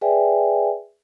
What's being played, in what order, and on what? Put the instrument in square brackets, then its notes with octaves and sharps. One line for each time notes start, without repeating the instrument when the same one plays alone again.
[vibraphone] G#4 B4 D5 E5 G5 G#5